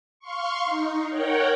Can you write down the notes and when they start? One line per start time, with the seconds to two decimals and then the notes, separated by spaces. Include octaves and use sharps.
0.20 F5 C6 C#6
0.65 D#4
1.10 A#4 C#5 F#5 G5